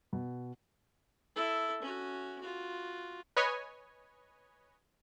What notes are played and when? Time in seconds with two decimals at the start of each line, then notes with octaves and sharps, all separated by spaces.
0.13 B2
1.35 E4 A4
1.82 C#4 F#4
2.40 F4 F#4
3.36 B4 C#5 D#5 G#5